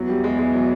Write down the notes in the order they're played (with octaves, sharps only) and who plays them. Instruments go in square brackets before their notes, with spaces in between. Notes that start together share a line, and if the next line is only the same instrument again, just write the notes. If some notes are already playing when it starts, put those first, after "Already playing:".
Already playing: [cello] E2 [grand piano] F#3
[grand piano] G3
G#3
G#3
F#3